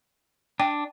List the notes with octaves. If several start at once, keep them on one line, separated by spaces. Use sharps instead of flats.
D4 G5